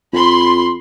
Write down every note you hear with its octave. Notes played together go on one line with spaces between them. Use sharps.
F2 B5 C6